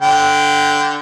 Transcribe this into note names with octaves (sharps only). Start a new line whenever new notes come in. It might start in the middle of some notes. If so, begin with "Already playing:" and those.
D3 G5